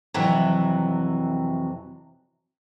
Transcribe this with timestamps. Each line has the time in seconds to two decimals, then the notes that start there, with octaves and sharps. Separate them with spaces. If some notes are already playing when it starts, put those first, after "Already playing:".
0.14 F2 C3 E3 F#3